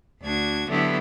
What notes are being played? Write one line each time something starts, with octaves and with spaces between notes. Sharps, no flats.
D2 D4 F#4 G#6
D3 F#3 A3 B3 E4 G4